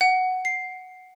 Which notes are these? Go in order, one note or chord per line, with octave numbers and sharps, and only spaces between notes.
F#5
C7